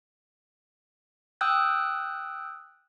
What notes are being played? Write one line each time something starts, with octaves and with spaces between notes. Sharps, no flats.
G5 D#6 E6 F#6 G6